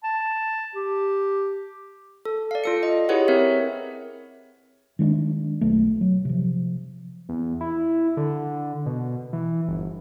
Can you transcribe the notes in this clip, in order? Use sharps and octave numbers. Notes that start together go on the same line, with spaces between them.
A5
G4
A4
D5 F5
F4 A4 C#7
D#5
E4 G4 G#4 B4 C#5 F#5
C4 A#4 C#5 E5
D#3 G#3 C#4 D4
B1 A3
F#3
C3 F3
E2
E4
D3
B2
E3
G1